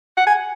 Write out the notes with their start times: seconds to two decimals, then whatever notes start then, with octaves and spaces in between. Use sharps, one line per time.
0.17 F#5
0.27 G#5